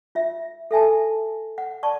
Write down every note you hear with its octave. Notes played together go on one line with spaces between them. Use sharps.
F4 E5
A4 E5 G#5 A5
F#5
D5 A5 C#6